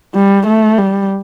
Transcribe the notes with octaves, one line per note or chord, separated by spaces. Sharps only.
G3
A3
G3